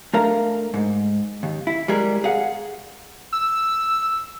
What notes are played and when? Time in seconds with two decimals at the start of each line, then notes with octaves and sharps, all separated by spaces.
0.13 A3 D4 A#4 F5 A#5
0.74 G#2
1.43 D#2
1.67 E4
1.88 G3 G#3 G#4 A#4
2.24 G#4 F5 F#5
3.32 E6